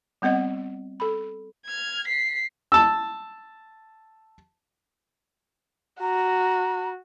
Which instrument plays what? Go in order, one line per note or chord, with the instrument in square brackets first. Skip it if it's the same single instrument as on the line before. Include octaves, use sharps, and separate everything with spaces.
[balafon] G3 B3 C4 D#5 F#5
A4 B5
[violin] F6 G#6
B6 C7
[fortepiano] A5 E6
[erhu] F#4 [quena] A#5